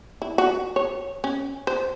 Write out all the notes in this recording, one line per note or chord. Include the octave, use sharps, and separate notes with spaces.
E4
F#4
C#5
C#4
C5